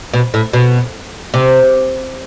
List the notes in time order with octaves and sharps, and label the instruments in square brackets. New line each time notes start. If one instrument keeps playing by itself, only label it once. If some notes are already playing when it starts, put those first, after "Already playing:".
[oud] B2
A2
B2
C3